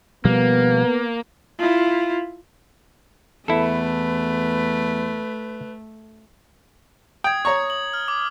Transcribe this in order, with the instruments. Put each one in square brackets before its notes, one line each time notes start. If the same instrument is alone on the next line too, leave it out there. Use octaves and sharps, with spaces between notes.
[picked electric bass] B2 F3 G3 [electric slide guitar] A#3 [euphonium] B3
[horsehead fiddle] E4 F4
[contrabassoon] E2 [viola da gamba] A3 [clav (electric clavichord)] E4 A4 [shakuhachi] B4
[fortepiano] G5 [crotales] D#6 G#6
[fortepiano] C#5 A#5 C#6
[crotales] F#7
F6
D6